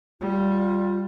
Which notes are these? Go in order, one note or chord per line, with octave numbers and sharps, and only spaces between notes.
G3 F4